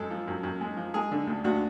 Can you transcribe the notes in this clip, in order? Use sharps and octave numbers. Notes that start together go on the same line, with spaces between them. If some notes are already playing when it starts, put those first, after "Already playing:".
Already playing: F#2 G#3 A4
F3
F#2
F#2
G#3
F3
G#3 G#4
D3
D2
D2 F#4